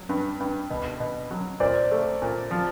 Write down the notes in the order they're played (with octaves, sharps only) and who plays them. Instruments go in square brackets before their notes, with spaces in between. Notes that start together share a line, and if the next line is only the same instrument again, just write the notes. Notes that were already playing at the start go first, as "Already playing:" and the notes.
Already playing: [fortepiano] F#3
G2
G2
B2
B2
F#3
[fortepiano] A#2 [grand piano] C5 D5
[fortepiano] A3
A#2
F3